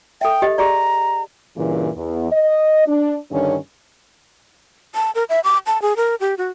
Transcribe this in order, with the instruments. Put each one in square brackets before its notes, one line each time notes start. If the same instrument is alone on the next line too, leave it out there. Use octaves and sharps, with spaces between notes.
[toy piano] A4 E5 [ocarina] G5
[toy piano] G4 D#5
[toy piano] G4 G#4 D5 [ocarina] A#5
[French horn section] G2 A#2 C#3 E3
E2
D#5
D4
G2 D3 D#3 C#4
[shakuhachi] A5
A#4
E5
D6
A5
G#4
A#4
G4
F#4